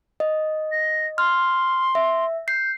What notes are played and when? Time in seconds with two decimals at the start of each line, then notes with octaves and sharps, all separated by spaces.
0.20 D#5
0.72 A#6
1.18 C6 F6
1.95 E5
2.48 G6 C7